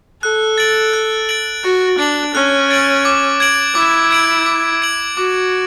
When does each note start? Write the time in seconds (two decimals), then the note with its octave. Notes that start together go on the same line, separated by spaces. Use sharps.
0.23 A4 F#6
0.58 A6 D7 F#7
0.93 F#6
1.29 A6 D7 F#7
1.64 F#4 F#6
1.99 D4 A6 D7 F#7
2.34 C#4 F#6
2.70 A6 D7 F#7
3.05 D6
3.40 G#6 D7 F#7
3.75 E4 D6
4.11 G#6 D7 F#7
4.46 D6
4.82 G#6 D7 F#7
5.17 F#4 D6